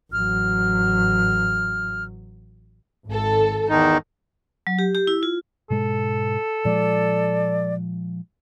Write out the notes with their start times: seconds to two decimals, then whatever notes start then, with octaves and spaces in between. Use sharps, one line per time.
0.13 A1 F#3 F6
3.06 G#1 A4
3.69 E2 D#3 D#4
4.67 F#3
4.79 G4
4.95 G4
5.07 E4
5.23 F4
5.70 G#2 B2 G#3 A4
6.65 A#2 F3 G#3 D5